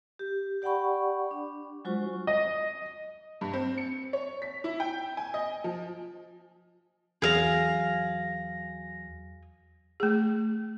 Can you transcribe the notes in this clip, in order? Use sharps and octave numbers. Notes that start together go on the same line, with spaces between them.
G4
G4 D5 F#5 G5 B5 C#6
D4
F#3 G#3 F4 F#4 C5 C#6
D#5
G2
C4
C#7
C#5
B6
E4
G5
G#5
D#5
F3
E2 F#3 G#4 F5 A#6
A3 G#4